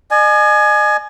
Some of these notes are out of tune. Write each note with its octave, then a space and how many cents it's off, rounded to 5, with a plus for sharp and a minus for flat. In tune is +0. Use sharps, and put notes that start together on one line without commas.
D#5 -45 G#5 +20